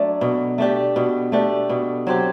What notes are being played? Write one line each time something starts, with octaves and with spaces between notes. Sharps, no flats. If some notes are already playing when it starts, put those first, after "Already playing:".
Already playing: F#3 A3 D4
B2
A3 D4 G4
B2
A3 D4 G4
B2
F#3 C4 G4